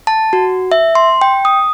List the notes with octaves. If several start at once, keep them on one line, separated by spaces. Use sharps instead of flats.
A5
F#4
E5
C6
G5
D#6